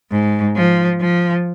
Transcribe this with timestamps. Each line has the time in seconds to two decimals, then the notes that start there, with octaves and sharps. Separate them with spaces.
0.11 G#2
0.56 F3
1.00 F3